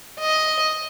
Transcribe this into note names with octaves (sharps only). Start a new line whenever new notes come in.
D#5